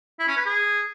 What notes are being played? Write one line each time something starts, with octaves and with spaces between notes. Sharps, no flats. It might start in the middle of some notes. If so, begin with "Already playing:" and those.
E4
C#4
B4
G#4